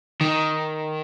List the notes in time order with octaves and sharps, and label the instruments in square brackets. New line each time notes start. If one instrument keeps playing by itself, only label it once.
[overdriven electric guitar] D#3